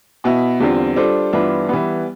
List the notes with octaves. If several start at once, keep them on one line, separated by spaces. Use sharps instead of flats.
B2 B3 E4
E2 D3 G3 C4 F4
G3 D4 F4 A4 C5
G2 E3 B3 D4 F4
E3 G3 B3